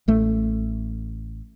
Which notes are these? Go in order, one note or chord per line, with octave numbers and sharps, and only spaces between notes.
A1 A3